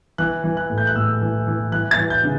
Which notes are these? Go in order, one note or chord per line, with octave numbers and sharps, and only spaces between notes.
E3 F#6
E3
F#6
A2
G6
F#6
A2 E6
E3
E3
E3 F#6
A6
E3
G6
C#3